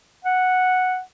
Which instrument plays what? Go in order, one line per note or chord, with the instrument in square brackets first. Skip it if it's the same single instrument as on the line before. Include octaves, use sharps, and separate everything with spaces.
[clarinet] F#5